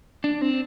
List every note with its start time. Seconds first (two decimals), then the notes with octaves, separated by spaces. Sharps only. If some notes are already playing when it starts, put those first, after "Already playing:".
0.24 D4
0.41 C4